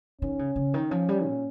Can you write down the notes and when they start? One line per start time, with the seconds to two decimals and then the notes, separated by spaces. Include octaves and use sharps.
0.21 D#3 C#4
0.39 C#3
0.56 C#3
0.74 D#3
0.90 F3 C#4
1.09 G3
1.26 A#2